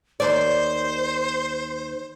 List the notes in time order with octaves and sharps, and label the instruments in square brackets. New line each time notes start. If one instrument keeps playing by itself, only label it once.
[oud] D#2 D5 [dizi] C5